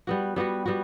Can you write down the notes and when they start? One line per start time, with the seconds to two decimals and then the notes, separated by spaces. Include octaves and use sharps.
0.07 G3 B3 F#4
0.36 G3 B3 F#4
0.66 G3 B3 F#4